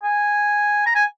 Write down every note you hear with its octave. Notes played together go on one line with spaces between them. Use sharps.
G#5
A#5
G#5